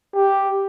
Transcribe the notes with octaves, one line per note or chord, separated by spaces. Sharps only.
G4